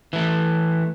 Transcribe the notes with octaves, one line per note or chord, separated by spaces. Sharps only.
E3 A3